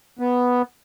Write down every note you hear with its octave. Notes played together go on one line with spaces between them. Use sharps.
B3